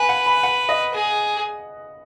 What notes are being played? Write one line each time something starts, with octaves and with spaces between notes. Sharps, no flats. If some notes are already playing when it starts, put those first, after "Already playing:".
Already playing: B4 G#5
F#5
B5
F#5
D#5
G#4